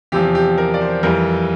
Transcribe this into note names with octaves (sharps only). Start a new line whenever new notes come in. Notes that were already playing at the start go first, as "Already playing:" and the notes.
E2 C3 F3 G4
G4
A#4
D5
C5
F2 E3 G3 A#4